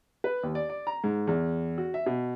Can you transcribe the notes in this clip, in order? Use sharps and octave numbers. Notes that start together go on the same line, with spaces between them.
B4
D#2
D5
D5
A#5
G#2
E2
F#4
E5
B2